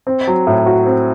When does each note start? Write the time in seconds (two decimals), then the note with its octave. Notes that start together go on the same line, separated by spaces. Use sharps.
0.07 C4
0.27 F#3
0.47 A2
0.66 F#4
0.86 C4